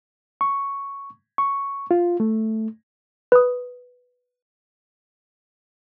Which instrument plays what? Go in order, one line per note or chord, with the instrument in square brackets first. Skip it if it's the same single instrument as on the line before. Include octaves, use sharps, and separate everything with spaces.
[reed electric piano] C#6
C#6
F4
A3
[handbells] B4 D#6